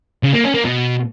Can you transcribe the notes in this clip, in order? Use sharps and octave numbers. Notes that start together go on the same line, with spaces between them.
C#3
A#3
C#4
A#3
B2